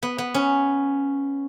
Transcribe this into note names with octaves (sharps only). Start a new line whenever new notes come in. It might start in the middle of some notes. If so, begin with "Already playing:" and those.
B3
B3
C#4